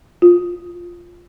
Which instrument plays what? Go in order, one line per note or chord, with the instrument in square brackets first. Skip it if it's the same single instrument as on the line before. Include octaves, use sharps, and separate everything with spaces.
[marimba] F4